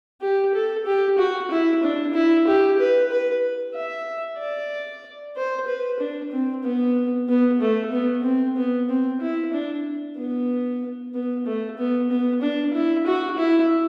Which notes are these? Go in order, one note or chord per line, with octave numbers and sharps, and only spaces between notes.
G4
A4
G4
F#4
E4
D4
E4
G4
B4
B4
E5
D5
C5
B4
D4
C4
B3
B3
A3
B3
C4
B3
C4
E4
D4
B3
B3
A3
B3
B3
D4
E4
F#4
E4